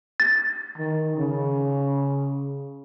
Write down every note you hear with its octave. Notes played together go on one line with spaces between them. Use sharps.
A6
D#3
C#3